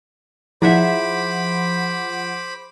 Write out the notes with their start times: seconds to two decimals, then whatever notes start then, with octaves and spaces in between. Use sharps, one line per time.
0.62 F3 E4 G#4 C5 E5 F#5 B5 D6